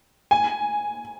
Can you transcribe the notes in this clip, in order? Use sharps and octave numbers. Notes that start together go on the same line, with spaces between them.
G#5